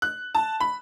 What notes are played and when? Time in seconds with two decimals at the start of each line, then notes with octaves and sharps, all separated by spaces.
0.02 F#6
0.35 A5
0.60 B5